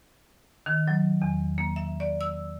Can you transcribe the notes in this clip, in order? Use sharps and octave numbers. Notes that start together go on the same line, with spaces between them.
D#3
F#3
E2
A#3
E5
D5
E6